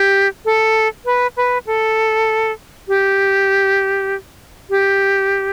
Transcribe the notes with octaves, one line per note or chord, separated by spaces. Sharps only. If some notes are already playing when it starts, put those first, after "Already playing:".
Already playing: G4
A4
B4
B4
A4
G4
G4